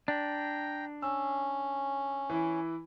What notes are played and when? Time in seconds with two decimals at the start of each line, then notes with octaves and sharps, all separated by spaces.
0.08 D4 G5 A#5
1.02 C#4 E6
2.30 E3 E4